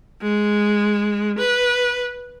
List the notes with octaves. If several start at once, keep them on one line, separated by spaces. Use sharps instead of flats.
G#3
B4